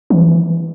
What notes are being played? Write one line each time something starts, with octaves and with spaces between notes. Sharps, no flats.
E3